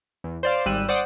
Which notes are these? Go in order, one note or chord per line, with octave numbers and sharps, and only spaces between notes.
E2
C5 D5 F5
G#1 G3 E6 F#6 D#7
C5 D5 F#5 D6 D#6